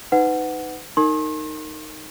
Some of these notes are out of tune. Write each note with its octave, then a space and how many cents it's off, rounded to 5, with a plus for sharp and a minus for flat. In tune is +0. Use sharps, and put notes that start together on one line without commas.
D#4 +0 B4 +30 F#5 +0
D#4 +0 A#4 -30 C6 +45